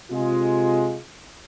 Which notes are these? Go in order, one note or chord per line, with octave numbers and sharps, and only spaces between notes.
C3 G#3 F4